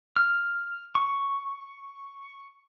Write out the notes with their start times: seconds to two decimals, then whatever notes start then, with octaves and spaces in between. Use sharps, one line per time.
0.16 F6
0.95 C#6